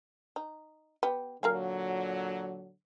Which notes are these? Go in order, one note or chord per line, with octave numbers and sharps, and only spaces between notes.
D#4
B3 G4
A#2 D3 F#3 A#4 F5 G#5